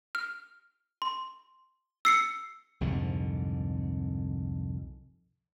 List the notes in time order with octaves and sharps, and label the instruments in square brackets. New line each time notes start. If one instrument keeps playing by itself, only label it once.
[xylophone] F6
C6
E6 C7 C#7
[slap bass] C2 F2 G#2 D3